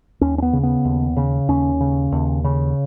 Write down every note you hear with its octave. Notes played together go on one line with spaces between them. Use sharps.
D#2 C#4
C#4
B3
C#3
B3
D#2
C#3
D#2 C#4
C#3
D#2
C#3